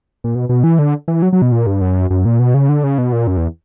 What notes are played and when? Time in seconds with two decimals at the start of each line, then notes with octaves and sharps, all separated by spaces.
0.24 A#2
0.35 B2
0.49 B2
0.64 E3
0.79 D3
1.08 E3
1.22 F#3
1.33 F#3
1.42 B2
1.52 A#2
1.67 G2
1.81 F#2
2.10 F#2
2.25 A#2
2.39 B2
2.54 C#3
2.69 D3
2.84 C#3
2.98 B2
3.13 A#2
3.27 F#2
3.37 E2